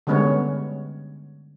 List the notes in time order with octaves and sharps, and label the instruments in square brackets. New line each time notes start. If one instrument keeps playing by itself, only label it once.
[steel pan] D3 G3 G#3 B3 C#4 C#5